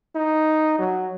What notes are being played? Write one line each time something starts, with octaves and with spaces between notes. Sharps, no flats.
D#4
F#3